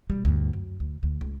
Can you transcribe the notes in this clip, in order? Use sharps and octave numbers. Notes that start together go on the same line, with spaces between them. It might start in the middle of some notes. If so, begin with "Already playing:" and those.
B2 G3
D2 G2
F#2
D2
D2
C#2